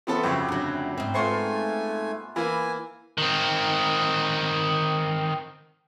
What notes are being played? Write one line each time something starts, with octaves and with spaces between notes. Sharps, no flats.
C3 E3 F3 B3 A4
F2 C#3 E4 F#4 G4
D2 F#3
G#2 C4
A3 B3 F4 C5 G#5 C6 C#6
E3 A#3 F5 G#5 B5
D#3 C4